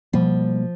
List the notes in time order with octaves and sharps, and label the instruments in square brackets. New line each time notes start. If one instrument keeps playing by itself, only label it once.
[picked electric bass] B2 G3 A#3 [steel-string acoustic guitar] F3